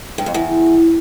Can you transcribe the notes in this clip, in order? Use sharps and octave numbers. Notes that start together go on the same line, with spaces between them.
G2
F2
E2